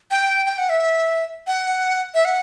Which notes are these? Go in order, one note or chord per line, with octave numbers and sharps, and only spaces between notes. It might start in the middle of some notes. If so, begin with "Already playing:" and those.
G5
G5
F#5
E5
F#5
E5
F#5